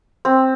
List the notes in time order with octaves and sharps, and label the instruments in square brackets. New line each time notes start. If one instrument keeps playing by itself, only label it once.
[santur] C4